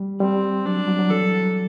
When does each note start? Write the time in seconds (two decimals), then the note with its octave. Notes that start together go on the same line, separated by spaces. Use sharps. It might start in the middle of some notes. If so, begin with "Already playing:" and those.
Already playing: G3
0.20 G3 C4
0.65 F#3 D4
0.77 G3
0.88 F#3
0.99 F#3
1.10 E3 A4